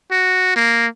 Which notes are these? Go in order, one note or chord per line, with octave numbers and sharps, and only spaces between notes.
F#4
A#3